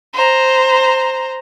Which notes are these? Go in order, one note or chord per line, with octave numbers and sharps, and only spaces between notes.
C5 A#5